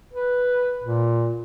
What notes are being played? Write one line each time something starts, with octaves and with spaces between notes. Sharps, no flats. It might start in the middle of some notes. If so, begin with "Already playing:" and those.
B4
A#2